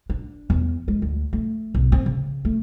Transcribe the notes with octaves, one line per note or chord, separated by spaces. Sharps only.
D4
E2
G#3
D2
A3
B1
C4
C#3
A3